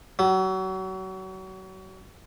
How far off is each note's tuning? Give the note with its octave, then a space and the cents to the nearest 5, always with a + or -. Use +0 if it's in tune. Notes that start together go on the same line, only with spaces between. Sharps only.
F#3 +35